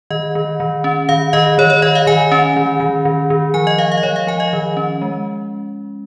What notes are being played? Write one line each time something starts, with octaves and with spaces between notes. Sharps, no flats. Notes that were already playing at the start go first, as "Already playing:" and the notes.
D#3 D#5
D#3
D#3
C#4
D#3 F5
D#3 D#5
D#3 C#5
C#5
D#3 D#5
F5
D#3 G#5
C#4
D#3
D#3
D#3
D#3
F3 G#5
D#5
F3 F5
F5
D#5
F3 C#5
F5
F3 G#5
D#5
D#3
C#4
G#3